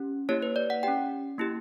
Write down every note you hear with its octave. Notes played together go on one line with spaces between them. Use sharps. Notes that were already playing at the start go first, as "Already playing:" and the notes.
Already playing: C#4 G4
A#3 E4 G4 C#5
B4
D5
F#5
C#4 G4 G5
A#3 E4 G4